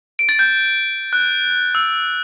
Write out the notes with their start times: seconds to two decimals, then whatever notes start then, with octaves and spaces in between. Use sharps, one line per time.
0.19 D7
0.29 A6
0.39 G6
1.13 F#6
1.75 E6